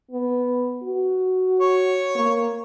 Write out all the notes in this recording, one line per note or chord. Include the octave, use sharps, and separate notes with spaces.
B3
F#4
C#5
A#3